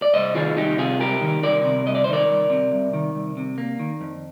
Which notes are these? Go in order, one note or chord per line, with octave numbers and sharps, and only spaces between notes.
D5
C2 C5 D#5
D#3 F4 G#4
C2 D#4 G4
C3 F4 G#4
C2 G4 A#4
D#3
C2 A#4 D5
C3
C2 D#5
D5
D#3 C5
A#4 D5
C2
C3
C2
D#3
C2
C3
A#3
D#3
F2